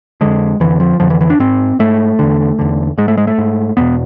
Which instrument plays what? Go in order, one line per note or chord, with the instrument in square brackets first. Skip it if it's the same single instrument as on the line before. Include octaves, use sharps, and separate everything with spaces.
[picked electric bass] F2 D3 G#3
F2 D3 E3
F3
F2 D3 F3
E3
E3
D4
G#2 C4
G#2 A3
E2 D3
E2 D3
G#2 G#3
A3
G#3
A3
G#2
E2 B2 B3